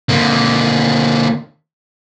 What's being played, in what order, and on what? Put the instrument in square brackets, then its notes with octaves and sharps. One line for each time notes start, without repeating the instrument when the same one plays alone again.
[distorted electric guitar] D3 A#3